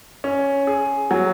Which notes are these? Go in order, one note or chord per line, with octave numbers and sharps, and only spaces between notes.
C#4
G#4
F#3